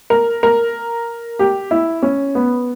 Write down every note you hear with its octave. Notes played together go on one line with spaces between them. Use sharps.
A#4
A#4
G4
E4
C#4
B3